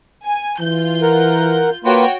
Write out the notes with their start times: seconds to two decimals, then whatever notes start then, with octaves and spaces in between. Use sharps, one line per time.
0.24 G#5
0.60 E3 F4 G6
1.02 A#4 F#5
1.84 A#3 F4 F#4 B4 C#5 G5